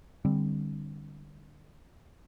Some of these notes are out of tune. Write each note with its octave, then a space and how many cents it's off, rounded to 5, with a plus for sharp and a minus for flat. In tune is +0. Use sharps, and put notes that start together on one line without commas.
D3 +25 G3 +15 C4 +10